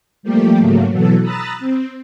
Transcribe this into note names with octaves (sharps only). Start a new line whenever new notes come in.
F3 G3 A3 A#3 G4
G#2 C#3 F#3 A3 A#3
B2 E3 F#3 A4
A#5 B5 D#6 E6 F#6 A6
C4